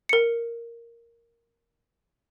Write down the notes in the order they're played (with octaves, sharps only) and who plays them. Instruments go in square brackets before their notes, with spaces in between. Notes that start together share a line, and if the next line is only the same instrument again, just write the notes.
[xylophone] A#4 C#7